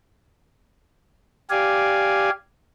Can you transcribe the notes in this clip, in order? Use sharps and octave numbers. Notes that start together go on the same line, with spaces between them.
G4 D5 F5 G#5